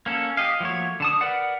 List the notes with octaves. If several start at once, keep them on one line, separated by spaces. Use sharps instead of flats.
A#3 C#4 A4
G4 D#5 F5
F3 F#3 A3 A#3 C#5
D3 A5 D#6
A#4 B4 D5 F#5